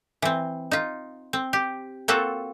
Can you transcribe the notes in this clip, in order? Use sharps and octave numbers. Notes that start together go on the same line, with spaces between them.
E3 C4
D#4 F4
C4
G4
A#3 C4 F4 F#4 A4